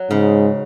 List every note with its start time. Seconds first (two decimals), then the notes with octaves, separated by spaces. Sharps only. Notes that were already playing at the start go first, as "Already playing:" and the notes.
Already playing: F#3
0.10 G#2 C#3